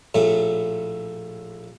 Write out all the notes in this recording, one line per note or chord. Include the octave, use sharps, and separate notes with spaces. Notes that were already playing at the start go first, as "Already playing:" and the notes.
A#1 A2 A3